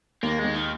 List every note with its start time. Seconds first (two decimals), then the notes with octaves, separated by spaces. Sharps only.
0.23 D#2 A#3
0.39 G#3
0.45 D#2
0.55 D#3